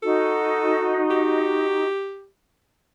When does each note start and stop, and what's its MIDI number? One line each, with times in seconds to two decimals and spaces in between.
0.03 1.85 63
0.03 1.85 66
0.03 1.05 69
1.10 2.27 67